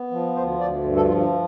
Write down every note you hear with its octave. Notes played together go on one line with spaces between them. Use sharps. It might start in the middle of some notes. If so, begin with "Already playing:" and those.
Already playing: B3
F3
D2 C5
D2 D5
G2
A4
F3 F4
D4